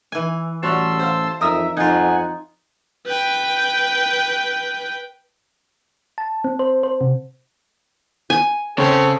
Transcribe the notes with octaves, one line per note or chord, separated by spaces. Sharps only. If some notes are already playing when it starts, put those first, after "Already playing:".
E3 G#5
A1 G3 F#4 C#5 A5 C6 E6
C5 F5
F2 D#4 A#4 E5 D#6 E6
F2 D#4 F4 F#5 G#5
B4 G5
A5
C4
C5
C5
C3
G#5
C#3 C4 A4 C#5